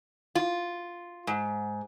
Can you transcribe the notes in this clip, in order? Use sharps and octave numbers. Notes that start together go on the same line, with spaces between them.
F4
G#2